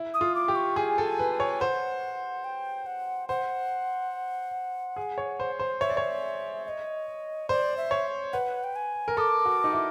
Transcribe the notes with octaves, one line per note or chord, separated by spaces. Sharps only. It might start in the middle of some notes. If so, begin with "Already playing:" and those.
Already playing: E4
D#6
F4
D6
G4
C#6
G#4 G#5
A4
B4
C#5
C5 F#5
G5
F#5
C5 F#5
G#4
C#5
C5
C5
C#5 E5
D5
C#5
E5
D#5
C5 D5
E5
C#5
B4 F#5
G5
G#5
A#4
A4 D6 D#6
F#4
D#4
E4